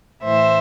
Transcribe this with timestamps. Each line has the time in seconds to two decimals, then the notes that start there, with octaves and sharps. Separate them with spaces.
0.22 A2 E3 C5 E5